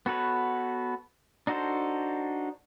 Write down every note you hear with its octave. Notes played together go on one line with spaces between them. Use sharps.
B3 F#4 A4 B4 C#5
D4 D#4 F#4 A4 C5